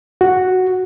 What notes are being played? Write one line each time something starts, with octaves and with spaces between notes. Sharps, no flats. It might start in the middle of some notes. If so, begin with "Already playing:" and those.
F#4